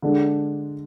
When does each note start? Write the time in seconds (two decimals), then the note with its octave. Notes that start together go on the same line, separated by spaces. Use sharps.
0.02 D3 G#3 D4